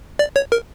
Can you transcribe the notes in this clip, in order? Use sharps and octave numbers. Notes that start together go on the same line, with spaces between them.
D5
C#5
A#4